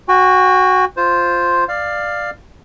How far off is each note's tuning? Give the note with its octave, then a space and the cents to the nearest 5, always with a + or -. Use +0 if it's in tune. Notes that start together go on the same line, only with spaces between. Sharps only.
F#4 +0 G5 +40
F4 +0 C5 +0
D5 +15 F5 +0